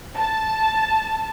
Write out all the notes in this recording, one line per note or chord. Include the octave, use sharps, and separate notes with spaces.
A5